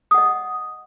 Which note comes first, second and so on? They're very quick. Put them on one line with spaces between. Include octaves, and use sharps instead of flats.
D#6 F#5 D#5